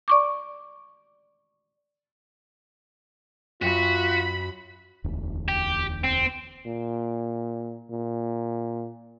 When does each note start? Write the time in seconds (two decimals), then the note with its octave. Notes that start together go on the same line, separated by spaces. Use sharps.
0.08 D5 C#6 D6
3.62 F#2 F4 F#4 G5 B5 F#6 B6
5.04 E1 D2
5.48 G4
6.04 C4
6.66 A#2
7.91 A#2